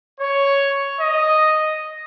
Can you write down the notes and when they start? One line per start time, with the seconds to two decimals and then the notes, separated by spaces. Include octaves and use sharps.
0.20 C#5
0.99 D#5